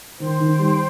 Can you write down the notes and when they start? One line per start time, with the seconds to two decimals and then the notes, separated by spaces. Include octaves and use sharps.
0.20 D#3 C5 G5 C6
0.40 D#3
0.59 G3